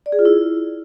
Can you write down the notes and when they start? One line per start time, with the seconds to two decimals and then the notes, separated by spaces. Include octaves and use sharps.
0.06 D5
0.12 G#4
0.19 F4
0.25 E4